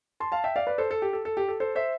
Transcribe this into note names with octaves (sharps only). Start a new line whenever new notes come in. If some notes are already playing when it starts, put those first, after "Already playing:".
A5 C6
F5 A5
E5 G5
D5 F5
B4 D5
A4 C5
A4
G4
A4
A4
G4
A4
A4 C5
C5 E5